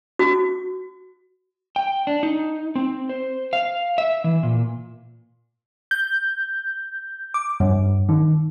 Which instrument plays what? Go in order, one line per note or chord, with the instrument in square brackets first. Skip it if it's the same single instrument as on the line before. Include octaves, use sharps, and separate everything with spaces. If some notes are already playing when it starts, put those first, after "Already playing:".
[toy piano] F#4
[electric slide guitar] G5
D4
D#4
C4
C5
F5
E5
E3
A#2
[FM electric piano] G6
D6
G2
D#3